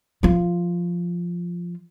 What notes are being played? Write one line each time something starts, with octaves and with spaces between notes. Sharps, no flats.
F3 F4